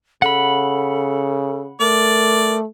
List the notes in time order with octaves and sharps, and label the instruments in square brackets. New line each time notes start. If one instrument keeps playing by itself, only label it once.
[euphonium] C#3 [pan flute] A4 [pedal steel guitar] F#5 B5
[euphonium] A3 [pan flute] A#4 [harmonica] D5